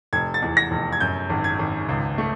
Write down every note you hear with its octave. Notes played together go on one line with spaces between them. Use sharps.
F1 G#6
A6
E2
A#6
F1
G#6
F#2 G6
G#1
G#6
G#1
C#2
A3